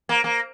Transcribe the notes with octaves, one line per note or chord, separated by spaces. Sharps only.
A#3
A#3